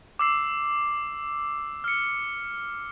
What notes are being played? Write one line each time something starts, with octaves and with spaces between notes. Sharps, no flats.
D6 E6 C7
F6 C#7